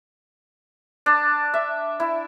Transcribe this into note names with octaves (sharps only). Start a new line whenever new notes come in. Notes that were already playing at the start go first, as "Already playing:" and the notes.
D4
E5
E4